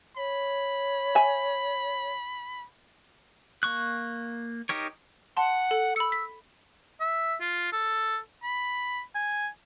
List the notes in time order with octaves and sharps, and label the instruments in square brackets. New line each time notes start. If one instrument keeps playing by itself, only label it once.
[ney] C#5 [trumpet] B5
[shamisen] E5 G#5
[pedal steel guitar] A#3 C#6 F#6
D#4 G4 A#4 C#5
[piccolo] F#5 [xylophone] A5 C6
[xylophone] A4
[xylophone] B5 C#7 [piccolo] E6
[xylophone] B6
[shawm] E5
F4
A4
B5
G#5